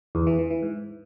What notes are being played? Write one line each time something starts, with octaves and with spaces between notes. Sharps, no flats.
E2
E3
E3
E3
G#2